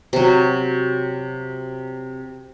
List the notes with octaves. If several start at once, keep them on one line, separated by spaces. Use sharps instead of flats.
C3 F#3